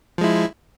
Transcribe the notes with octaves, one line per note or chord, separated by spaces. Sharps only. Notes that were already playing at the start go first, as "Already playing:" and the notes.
F3 G#3 E4